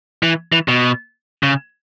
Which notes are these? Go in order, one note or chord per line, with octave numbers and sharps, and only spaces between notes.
E3
E3
B2
C#3